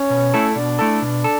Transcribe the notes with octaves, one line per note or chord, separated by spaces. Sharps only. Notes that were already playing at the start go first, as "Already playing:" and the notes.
Already playing: C#4 C#5
B2
A3 E4 A4
B2 D4 D5
A3 E4 A4
B2
A4